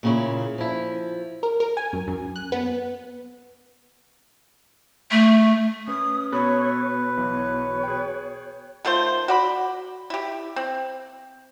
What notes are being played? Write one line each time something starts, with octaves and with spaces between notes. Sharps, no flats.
A#2 C#3 E4
F3 E4
A#4
A#4
G#5
F#2
F#2
F#6
B3
A3
C#4 B4 D#6
B2 A4 B4 C#5 B5 F#6
B1 E3 C#5
G#4 G5
D#3 A3 F4 C5
F#4 D5 B5
E4 G4
C4